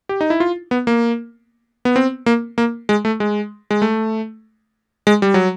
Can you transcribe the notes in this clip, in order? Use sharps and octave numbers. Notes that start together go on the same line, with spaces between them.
G4
D#4
E4
F4
B3
A#3
B3
C4
A#3
A#3
G#3
A3
G#3
G#3
A3
G#3
G3
F#3